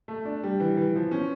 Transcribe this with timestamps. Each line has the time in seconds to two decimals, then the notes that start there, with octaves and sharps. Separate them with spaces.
0.08 A3
0.25 D4
0.43 G3
0.60 E3
0.77 E3
0.95 F3
1.11 C#4